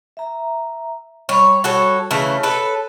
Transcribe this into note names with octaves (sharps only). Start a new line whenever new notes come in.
E5 A#5
G3 C#5 B5
F#4 A4 C#5
C#3 E3 A3 C#5
A4 B4